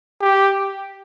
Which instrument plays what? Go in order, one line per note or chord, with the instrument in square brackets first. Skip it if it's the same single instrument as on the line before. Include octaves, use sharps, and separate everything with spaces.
[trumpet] G4